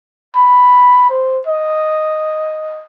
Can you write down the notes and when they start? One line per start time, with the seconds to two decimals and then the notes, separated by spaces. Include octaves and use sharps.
0.36 B5
1.10 C5
1.47 D#5